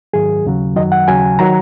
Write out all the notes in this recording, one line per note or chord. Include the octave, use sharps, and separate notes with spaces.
G#2 D#3 F#3 G#4
D#2 C#3 F#3
F#2 D#3 F#3 D#5
F#5
D#2 C#3 F#3 G#5
D#3 F#3 A#5